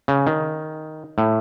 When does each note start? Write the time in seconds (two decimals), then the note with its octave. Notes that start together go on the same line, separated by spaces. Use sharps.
0.08 C#3
0.27 D#3
1.18 A2